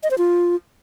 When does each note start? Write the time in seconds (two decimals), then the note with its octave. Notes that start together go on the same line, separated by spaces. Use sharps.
0.03 D#5
0.11 C5
0.18 F4